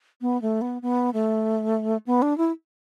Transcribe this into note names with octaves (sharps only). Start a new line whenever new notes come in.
B3
A3
B3
B3
A3
B3
D4
E4